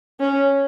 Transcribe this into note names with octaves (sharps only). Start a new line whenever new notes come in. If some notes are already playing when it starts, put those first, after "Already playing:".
C#4